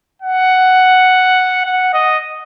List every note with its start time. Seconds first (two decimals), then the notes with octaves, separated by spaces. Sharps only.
0.22 F#5
1.65 F#5
1.94 D#5